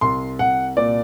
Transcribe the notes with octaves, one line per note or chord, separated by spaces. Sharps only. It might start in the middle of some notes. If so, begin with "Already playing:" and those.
C2 C6
C2 F#5
A#2 D5